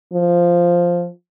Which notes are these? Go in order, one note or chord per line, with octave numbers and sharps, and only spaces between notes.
F3